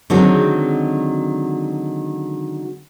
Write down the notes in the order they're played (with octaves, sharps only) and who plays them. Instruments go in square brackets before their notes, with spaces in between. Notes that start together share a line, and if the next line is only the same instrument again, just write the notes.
[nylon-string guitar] D3 D#3 F#3 G#3 C4